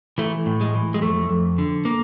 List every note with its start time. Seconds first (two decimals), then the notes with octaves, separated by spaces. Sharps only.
0.18 E3 A3
0.46 A2
0.61 G#3
0.75 E3
0.94 G#3
1.02 F2 A3
1.30 F2
1.58 D3
1.85 A#3